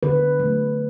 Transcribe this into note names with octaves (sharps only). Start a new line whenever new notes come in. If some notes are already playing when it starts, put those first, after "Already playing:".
D3 B4
F#3 A3